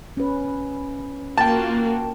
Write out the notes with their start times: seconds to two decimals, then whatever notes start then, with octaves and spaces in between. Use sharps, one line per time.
0.17 C#4 B4
1.38 A#3 F4 F#4 G5 A5